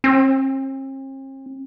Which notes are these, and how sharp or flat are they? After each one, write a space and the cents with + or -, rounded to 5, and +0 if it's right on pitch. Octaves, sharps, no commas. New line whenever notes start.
C4 +45